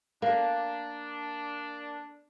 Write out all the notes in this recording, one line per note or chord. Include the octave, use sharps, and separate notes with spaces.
A#3 D4